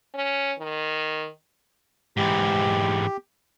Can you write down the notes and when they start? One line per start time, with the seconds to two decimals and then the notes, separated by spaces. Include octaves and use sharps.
0.14 C#4
0.59 D#3
2.17 G#2 E3 G4